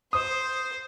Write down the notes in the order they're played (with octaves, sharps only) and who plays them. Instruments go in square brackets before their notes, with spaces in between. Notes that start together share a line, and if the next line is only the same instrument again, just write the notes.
[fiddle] C5 [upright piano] D#6